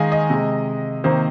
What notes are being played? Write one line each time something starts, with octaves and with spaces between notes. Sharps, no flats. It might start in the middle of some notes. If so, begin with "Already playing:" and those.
Already playing: D#3 G#3 D#5 F5 G#5
D#5
C3 G#3
C3 D#3 A#3 C5